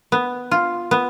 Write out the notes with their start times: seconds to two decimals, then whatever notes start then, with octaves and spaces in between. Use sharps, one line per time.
0.12 B3
0.51 F4
0.91 B3